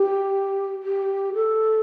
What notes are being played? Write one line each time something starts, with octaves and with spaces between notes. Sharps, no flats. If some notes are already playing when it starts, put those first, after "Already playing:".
Already playing: G4
G4
A4